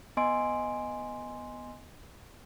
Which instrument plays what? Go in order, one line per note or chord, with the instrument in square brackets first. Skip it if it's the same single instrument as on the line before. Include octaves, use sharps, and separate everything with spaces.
[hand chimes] B3 D#5 G#5 C6 D7